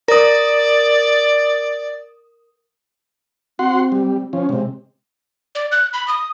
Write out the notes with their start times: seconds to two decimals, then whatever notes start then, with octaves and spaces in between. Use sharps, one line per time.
0.08 A#4 D5 D#6
3.59 C4 F#4 F#5 C6
3.92 G3
4.33 F3 C#4
4.49 C3 G#3
5.55 D5
5.72 F#6
5.93 B5
6.08 D#6